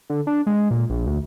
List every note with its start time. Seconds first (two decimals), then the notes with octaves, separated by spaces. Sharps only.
0.10 D3
0.27 D4
0.47 G#3
0.71 A#2
0.90 A#1
1.07 D2